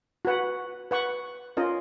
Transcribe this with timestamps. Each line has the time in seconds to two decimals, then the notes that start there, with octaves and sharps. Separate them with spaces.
0.25 F#4 B4 F#5
0.91 B4 F#5 C#6
1.57 C#4 F4 A#4 D#5